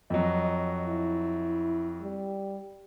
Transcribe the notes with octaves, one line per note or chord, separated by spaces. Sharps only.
F2 F#3 D#5
E4
G3